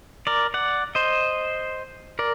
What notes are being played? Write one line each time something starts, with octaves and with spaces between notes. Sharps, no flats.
A#4 D5
D5 F#5
C5 D#5
A#4 D5